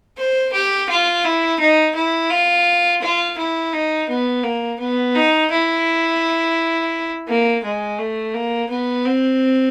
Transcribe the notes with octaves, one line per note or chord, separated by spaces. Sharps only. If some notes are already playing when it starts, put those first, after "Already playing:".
C5
G4
F4
E4
D#4
E4
F4
F4
E4
D#4
B3
A#3
B3
D#4
E4
A#3
G#3
A3
A#3
B3
C4